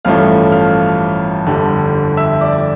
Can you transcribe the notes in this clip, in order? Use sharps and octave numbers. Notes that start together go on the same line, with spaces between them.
A1 G2 F3 A3 C#4 F5 F6
F5 F6
G1 F2 D3 G3
E5 E6
D5 D6